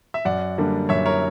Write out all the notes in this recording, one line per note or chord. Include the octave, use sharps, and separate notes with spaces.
E5
F#2 D5 F#5
D3 G3 A#3 D4
F#2 C#5 E5
A#4 C#5